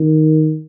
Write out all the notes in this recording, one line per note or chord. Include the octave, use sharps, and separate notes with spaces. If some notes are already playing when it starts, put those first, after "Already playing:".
Already playing: D#3